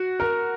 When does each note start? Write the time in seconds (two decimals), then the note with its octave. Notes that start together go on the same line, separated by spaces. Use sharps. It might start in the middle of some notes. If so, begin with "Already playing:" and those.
Already playing: F#4
0.20 A#4